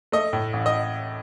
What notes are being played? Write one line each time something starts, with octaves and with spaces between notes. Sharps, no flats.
A3 D#5
A2
A1
D#5